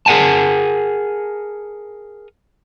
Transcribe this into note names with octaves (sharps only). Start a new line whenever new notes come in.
G#4 A#4 F#5 G#5 A5